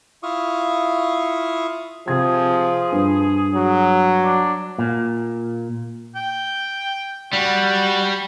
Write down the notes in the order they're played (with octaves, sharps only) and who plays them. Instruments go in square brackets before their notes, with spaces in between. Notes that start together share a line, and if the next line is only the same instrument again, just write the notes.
[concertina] E4 F4 F5 C#6 D#6
[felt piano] C3 G#6 [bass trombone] F3 [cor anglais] G#4
[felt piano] G2
[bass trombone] F#3
[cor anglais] D4
[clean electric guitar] A#2
[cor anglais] G5
[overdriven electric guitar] G3 [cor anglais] F#4